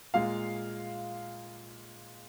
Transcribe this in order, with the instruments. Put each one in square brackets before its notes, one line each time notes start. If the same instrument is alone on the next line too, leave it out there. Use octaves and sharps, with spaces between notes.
[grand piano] A#2 G#3 F5